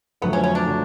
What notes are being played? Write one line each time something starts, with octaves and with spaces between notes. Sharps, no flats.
F2 D3 F#3 A3 B3
C#4
C#4
D4
D3 F#3 A3